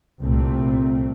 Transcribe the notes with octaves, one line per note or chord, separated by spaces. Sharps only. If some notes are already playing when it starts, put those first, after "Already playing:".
C2 A#2 A3 C4